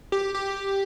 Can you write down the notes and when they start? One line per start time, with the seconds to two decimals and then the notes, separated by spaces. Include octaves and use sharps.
0.12 G4
0.34 G4